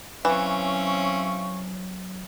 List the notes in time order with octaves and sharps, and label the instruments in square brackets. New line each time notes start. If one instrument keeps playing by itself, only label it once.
[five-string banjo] E3 [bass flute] F#3 [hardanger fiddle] C4 C#4 [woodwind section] E5 F5 C#6